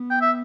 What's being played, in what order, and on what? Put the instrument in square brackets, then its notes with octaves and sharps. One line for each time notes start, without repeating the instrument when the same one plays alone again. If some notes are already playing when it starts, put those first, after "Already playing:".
Already playing: [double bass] B3
[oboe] G5
E5